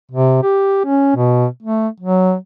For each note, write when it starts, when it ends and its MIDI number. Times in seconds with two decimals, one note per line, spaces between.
0.11 0.38 48
0.43 0.84 67
0.85 1.14 61
1.16 1.46 47
1.62 1.88 57
2.00 2.35 54